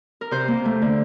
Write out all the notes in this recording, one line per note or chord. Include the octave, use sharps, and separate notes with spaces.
A#4
C3 C5
A#3
A3
D3